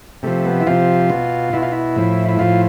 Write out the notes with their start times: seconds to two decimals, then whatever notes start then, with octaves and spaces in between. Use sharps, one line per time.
0.23 C3 F3 A3
0.45 B3
0.60 E4
0.67 C3 F3 F4
1.10 B2
1.53 B2 E4
1.62 F4
1.72 E4
1.96 A2 F3
2.29 E4
2.39 A2 F3 F4